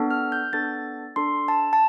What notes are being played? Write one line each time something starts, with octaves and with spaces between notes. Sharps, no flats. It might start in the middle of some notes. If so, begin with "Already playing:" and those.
Already playing: B3 D4 A4
F6
G6
B3 D4 A4 A6
D4 A4 C6
A5
A5